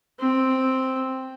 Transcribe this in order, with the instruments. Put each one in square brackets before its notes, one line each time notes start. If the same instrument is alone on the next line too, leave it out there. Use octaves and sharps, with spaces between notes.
[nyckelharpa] C4